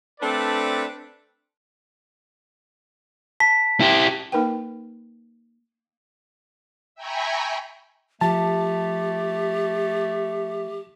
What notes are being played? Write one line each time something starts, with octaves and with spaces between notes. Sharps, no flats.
A3 C4 D4 B4 D5
A5 B6
E4 G4
A#3 D#4 A#4 B4 G5
E5 G5 G#5 A#5 B5 C#6
F3 A3 G4 A5